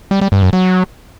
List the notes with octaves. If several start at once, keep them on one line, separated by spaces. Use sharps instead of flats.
G3
G3
G2
F#2
F#3